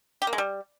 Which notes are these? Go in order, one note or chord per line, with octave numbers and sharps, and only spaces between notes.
G4
A#3
G#3
G3